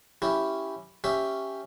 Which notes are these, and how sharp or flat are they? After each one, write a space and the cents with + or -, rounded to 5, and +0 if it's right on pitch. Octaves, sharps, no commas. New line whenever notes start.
C#4 +0 E4 +0 G4 -5
C#4 +0 G4 +0 E5 +0